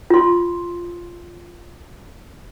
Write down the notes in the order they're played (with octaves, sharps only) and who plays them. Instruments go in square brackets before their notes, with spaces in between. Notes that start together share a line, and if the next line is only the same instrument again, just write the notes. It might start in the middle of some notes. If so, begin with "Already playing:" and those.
[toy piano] F4 C6